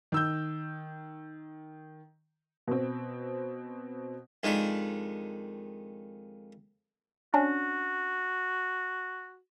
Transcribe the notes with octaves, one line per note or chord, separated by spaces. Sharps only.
D#3 E6 G6
B2 C4
F2 D#3 G#3 D4 B5
C#4 D4 F#4